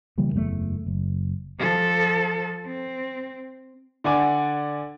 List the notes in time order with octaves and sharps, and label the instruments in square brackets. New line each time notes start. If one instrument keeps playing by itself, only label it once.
[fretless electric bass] C#3 E3 G3 A#3
F#1 E2 A#2 A3
F#1
[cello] F3 A4
C4
[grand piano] D3 D5 F#5 G#5 D6